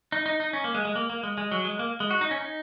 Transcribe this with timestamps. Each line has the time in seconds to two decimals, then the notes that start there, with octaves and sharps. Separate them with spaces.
0.12 D#4
0.26 D#4
0.40 D#4
0.53 C#4
0.64 A#3
0.75 G#3
0.85 G#3
0.96 A#3
1.10 A#3
1.23 G#3
1.38 G#3
1.52 F#3
1.65 G#3
1.79 A#3
2.00 G#3
2.11 F#4
2.21 D#4
2.31 C#4
2.41 D#4